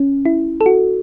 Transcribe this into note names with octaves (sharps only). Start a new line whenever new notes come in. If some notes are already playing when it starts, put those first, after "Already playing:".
Already playing: C#4
E4
A4
F#4